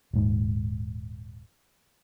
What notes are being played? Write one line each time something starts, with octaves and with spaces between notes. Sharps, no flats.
D#1 G#2